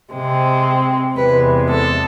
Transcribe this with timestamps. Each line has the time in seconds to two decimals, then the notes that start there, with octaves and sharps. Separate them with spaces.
0.12 C3 G#3 C4
1.16 E2 C3 G#3 B4
1.69 A4